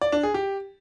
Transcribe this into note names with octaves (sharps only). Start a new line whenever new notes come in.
D5
D4
G#4
G4